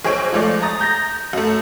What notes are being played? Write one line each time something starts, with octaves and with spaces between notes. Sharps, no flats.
B1 G#4 C5 C#5 D7
F3 G#3 A3 D5
A#5 D#6 A6
A#5 G6 A6 A#6
F#2 A3